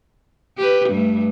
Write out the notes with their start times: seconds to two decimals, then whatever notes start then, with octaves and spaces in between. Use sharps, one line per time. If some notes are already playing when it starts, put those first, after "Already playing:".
0.58 G4 B4
0.90 G2 G3 A3